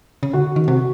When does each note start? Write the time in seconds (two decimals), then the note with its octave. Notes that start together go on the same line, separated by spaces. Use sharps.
0.23 C#3
0.33 D3 F#4
0.56 D#3
0.68 C3 F#4